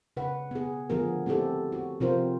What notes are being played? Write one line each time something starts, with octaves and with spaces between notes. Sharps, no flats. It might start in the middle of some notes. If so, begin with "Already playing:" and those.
C#3 B4 F#5
B3 G#4
D3 F3 A3 B3 G#4 A#4
A3 C4 E4 G4 A4
F#4
C3 F3 C4 F4 A#4 C5